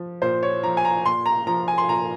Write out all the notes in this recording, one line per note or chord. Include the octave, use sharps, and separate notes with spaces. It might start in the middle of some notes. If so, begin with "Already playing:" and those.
Already playing: F3
A#2 C5
C#5
F3 A#5
G#5
A#5
A#2 C6
A#5
F3 A#5
G#5
C6
A#2 A#5